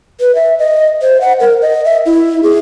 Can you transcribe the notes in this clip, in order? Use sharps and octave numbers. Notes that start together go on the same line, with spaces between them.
B4
E5
D#5
C5
F#5
A#4
D#5
E5
E4
G#4